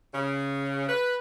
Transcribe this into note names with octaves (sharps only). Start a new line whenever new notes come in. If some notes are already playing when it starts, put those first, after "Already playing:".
C#3
B4